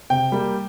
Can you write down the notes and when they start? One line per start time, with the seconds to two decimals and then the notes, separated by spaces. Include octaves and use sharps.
0.10 C3 G5
0.32 G3 A#3